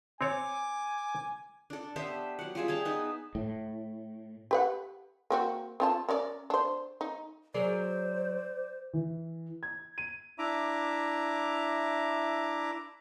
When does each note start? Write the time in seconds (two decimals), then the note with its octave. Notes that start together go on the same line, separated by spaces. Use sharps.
0.21 C4 C#5 G#5 D6
1.70 D4 A4
1.96 B3 G4 C5 E5
2.39 F#3 F#5
2.55 G3 F4 G#4 E5
2.68 G#4 G5 A5 A#5
2.85 B3 D#4 E5
3.35 A2
4.51 G4 B4 F#5
5.30 A#3 C4 F#4
5.80 C4 F4 A5
6.09 C#4 A#4 D5
6.50 D4 C5
7.01 D#4
7.54 F#3 G#4 A#4 C5 D5
8.93 E3
9.63 G#6
9.98 D#7
10.38 D4 E4 E5 A#5 D6